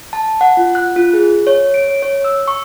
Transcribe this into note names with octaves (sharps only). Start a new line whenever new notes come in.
A5
F#5
F4
F#6
F4
G#4
C#5
D7
C#5
C#5
E6
C#6